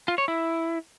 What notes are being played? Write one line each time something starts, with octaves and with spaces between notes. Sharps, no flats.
F4
C#5
E4